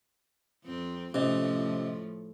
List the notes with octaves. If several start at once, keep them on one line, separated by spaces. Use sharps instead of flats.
F2 C4
A2 C3 F3 A3 C#4 D#5